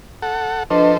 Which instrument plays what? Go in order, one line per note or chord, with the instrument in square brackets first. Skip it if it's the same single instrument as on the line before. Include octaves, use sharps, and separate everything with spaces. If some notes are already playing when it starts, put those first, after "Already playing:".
[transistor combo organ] A4 F#5
[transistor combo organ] F3 A4 C5 [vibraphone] D4 B4 D#5